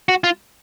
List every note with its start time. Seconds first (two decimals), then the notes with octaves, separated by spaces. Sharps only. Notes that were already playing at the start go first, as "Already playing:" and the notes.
0.09 F#4
0.24 F4